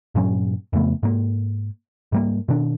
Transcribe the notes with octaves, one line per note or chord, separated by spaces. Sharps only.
G2 A#2 F#3 C#4
F2 C#3 A3 B3
G#2 A#3
G#2 G3 A#3
B2 D#3 D4